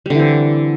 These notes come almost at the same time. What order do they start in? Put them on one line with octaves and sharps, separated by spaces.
G3 D3 E3 C4